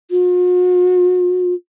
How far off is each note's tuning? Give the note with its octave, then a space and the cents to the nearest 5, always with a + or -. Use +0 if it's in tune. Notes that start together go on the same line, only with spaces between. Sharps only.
F#4 -45